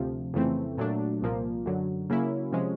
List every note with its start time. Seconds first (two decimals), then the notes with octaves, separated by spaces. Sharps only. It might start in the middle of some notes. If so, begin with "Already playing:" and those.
Already playing: D2 C3 F3
0.34 F2 C#3 E3 A3 C4
0.78 A#2 F#3 A3 D4
1.22 C2 A#2 F3 A#3
1.66 F#2 D3 F#3
2.10 C#3 F#3 A#3 C#4 E4
2.52 C3 F3 G#3 C#4